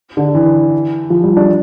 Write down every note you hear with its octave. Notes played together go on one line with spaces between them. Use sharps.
D3
E3
F3
G3
D4